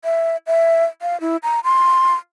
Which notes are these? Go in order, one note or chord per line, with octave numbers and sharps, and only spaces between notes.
E5
E5
F5
E4
A#5
C6